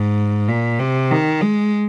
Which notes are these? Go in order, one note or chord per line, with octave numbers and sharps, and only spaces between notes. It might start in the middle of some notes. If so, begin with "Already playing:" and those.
Already playing: G#2
A#2
C3
D#3
G#3